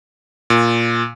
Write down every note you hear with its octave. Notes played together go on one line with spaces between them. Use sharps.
A#2